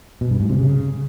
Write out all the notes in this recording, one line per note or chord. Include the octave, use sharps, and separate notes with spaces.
B2
G2
G#2
C3
C#3